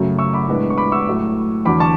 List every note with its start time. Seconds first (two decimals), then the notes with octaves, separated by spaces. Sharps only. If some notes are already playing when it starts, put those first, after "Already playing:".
Already playing: F#2 C#3 F#3 A3
0.19 C#6 E6
0.33 B5 D6
0.48 A2 G#3 B3 D4
0.70 C#6
0.78 B5 D6
0.92 C#6 E6
1.07 A2 F#3 A3
1.65 E2 D3 F#3 B5 D6
1.80 A5 C#6